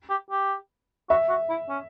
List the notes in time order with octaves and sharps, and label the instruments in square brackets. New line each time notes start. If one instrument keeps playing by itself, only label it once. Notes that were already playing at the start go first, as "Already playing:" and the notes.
[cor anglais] G4
G4
[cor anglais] F#4 [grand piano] E5
[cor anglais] F#4
E4
C#4